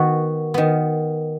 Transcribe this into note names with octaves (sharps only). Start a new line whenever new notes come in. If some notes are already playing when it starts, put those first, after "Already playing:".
Already playing: D#3 B3 F#4
D#3 B3